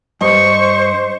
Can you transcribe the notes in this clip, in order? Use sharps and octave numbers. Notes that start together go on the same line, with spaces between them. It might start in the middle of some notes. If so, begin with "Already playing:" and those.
G2 C5 D#5 C#6